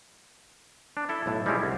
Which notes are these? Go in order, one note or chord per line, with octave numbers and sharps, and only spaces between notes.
D4
E4 A4 E5
B1 A2
G3 G#3 C4 C#4 E4 F4
C2